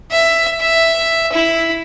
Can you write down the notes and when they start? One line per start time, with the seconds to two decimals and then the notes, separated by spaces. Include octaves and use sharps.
0.11 E5
0.61 E5
1.32 E4